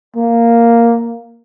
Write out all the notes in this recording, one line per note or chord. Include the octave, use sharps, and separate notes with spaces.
A#3